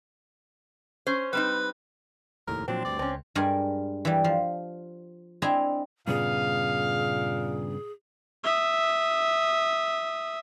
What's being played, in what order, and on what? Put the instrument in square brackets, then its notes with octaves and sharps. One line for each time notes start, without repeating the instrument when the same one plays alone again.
[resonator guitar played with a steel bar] C#4 C5
[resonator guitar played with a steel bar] G3 C4 D#4 [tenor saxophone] B4
[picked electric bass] F1 D#2 A2 [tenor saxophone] A#4
[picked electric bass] A#2 F3 F#3 [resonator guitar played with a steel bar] C4 [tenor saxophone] D4
[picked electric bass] D2 G2 [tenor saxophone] D5
[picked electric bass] C#2 [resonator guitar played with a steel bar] C4 C#4
[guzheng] G2 G3 G#3 A#4 D5 G#5
E3 G3
F3
C4 D4 E4 D#5 G#5 A#5
[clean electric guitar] G2 C#3 B3 [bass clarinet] A#2 [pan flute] G#4 [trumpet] F5
[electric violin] E5 D#6